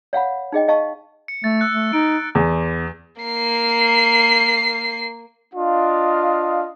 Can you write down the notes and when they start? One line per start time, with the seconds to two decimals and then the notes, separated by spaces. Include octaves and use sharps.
0.13 C#5 F5 F#5 B5
0.52 D#4 G#4 D#5 G5
0.68 D#5 F5 A5 C#6
1.28 C#7
1.44 A3 A6
1.60 E6 F#6 C#7
1.72 A3
1.93 D#4 D7
2.35 E2
3.22 A#3 C7
5.54 D4 F4 D#5 F5